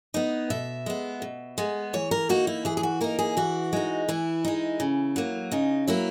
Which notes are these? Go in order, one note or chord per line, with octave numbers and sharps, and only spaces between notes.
B3 D#4
B2 E5
G#3 B3
B2
G#3 B3
E3 C#5
A#4
A#3 D#4 F#4
E4
E3 G#4
G#4
F#4
A#3 D#4 A#4
G#4
E3 F#4
G#3 D#4
E3 E4
G#3 D#4
C#3
F#3 A#3
C#3 D#4
F#3 A#3 E4